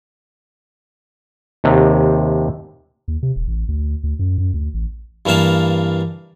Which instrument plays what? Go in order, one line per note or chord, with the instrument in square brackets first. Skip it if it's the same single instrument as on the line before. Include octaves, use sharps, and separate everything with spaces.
[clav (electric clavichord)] D#2 C3
[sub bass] D#2
C3
D#1
A1
D2
D2
F#2
F#2
D2
A1
[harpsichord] G2 E3 A#3 F5 A5